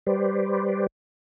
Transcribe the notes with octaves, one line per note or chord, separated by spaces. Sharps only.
G3 G4 B4 C5 D5